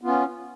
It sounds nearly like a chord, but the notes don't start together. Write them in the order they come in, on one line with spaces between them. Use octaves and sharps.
B3 F4 C#4